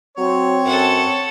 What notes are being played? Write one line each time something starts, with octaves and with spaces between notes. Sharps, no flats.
F#3 C4 C#5
F#2 A4 F#5